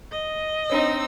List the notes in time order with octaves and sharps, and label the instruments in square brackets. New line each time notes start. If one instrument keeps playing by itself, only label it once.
[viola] D#5
[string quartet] C4 D#4 E6 [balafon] D4 C#5